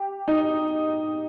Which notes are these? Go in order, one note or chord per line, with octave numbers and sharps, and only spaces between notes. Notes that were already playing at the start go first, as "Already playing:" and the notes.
Already playing: G4
D#4